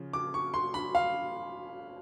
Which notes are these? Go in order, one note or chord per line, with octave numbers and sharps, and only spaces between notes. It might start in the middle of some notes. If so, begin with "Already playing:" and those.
Already playing: C#3 F3
D6
C#6
C6
B5
F5